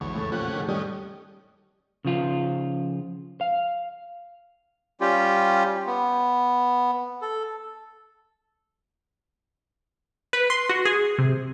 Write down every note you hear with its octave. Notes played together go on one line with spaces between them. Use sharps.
A#1 E2 G#2 D3 E3 C#5
F2 A2 C#3 A4
A#2 F3 C#4 G4 F#5 F#6
D#3 G#4
G3 C#4 G4 D#5
C#3 F3 F4
F5
G3 C#4 F4 G4
B3
A4
B4
C6
F#4
G#4
C3